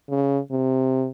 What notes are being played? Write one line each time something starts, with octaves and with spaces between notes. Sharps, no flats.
C#3
C3